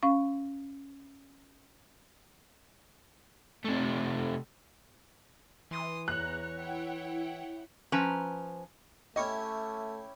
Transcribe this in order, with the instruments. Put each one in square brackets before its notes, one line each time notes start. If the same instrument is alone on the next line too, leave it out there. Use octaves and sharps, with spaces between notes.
[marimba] C#4 F5 C#6
[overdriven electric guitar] C3 A3
[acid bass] E3 [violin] C6 D#6
[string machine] E2 A#5 [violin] C#5 [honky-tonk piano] F#6
[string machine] E4 F#5 G5
[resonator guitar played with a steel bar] F3 C#4 B4 C5 A#5
[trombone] A3 [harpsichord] C#4 E4 G4 [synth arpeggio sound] D#5 C#6